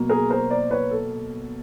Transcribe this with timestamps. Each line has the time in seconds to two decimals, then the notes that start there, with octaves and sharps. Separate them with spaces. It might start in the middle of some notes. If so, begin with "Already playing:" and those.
Already playing: B2 F#3 A#3
0.09 G#4 A#4
0.30 A#4 C5
0.50 C5 D5
0.71 B4 C#5
0.91 A4